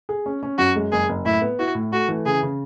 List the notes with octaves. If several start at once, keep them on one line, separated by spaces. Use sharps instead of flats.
G#4
C#4
C#4
F#2 F#4
G#3
F#1 G#4
F#1
A2 E4
B3
E4 F#4
A2
A3 F#4
E3
C#3 G#4
C#3